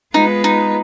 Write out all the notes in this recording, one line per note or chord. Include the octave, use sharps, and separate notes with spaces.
G#3 B3 D#4 F4 B4
D#4